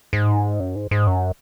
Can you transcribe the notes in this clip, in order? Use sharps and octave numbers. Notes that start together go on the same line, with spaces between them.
G#2
F#2
G#2
G#2
F#2